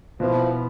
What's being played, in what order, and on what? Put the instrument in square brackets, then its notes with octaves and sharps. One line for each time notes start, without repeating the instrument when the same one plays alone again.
[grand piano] B2 B3 E4 [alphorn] F3